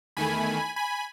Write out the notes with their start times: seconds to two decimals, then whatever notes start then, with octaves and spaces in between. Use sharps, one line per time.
0.17 E2 D#3 A3 G#5 B5
0.76 G#5 B5